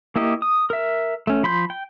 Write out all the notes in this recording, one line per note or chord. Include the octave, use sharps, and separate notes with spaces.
A#3 E4 G4 D#5
D#6
A#4 E5
A3 C#4
F3 B5 C6 G6
G5